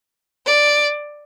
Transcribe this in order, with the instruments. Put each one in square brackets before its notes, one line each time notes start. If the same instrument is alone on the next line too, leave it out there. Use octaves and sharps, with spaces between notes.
[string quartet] D5